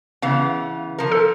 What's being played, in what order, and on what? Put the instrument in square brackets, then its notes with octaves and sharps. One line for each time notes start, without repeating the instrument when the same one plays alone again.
[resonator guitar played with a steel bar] C#3 E3 B3 [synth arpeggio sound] F5
[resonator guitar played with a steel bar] F3 A#4
[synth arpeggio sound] A4